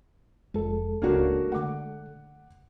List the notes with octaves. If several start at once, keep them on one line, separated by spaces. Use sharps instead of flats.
F1 F2 G#3 A4
D1 C#2 C#3 A#3 D4 F#4
D3 A3 F#5 D6